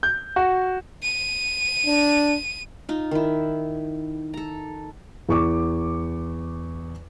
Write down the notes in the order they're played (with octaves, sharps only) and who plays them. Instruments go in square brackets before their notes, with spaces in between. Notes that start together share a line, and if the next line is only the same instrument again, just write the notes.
[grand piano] G6
F#4
[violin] D#7
[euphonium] D4
[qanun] D#4 F4
D#3 E4
A4 A#5
[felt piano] E2 C#6 D6